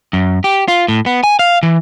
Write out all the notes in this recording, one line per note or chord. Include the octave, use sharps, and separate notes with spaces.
F#2
G4
F4
A2
B3
G#5
F5
E3